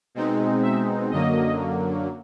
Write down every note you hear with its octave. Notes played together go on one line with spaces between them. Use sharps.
B2 G#3 C4 D#4
E5
F#2 D3 F#3 A#3 D#5